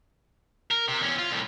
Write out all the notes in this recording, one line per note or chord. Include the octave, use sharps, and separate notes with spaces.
A#4
C3
E2 C#4
F4
C2 A2